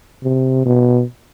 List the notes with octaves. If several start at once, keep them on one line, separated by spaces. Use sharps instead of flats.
C3
B2